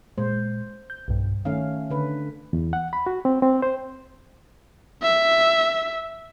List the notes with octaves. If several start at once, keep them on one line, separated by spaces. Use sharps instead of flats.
A#2 G#3 C5
G6
B1 G2
D#3 A3 C#4 F5
D3 B4
E2
F#5
B5
F#4
C4
C4
C5
E5